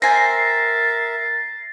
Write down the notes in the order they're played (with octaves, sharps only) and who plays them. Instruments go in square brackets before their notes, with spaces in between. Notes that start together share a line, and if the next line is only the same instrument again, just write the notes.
[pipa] C4 G#5 [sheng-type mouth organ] A#4 E5 [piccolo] A6 [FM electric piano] A#6 C7